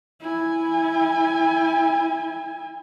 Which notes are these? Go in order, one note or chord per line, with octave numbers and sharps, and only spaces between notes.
E4 G#5